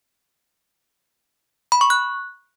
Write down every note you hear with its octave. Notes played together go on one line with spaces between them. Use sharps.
B5
C#6
F#6